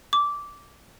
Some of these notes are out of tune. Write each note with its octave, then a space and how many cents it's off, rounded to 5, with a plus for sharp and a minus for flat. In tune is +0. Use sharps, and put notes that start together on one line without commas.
D6 -15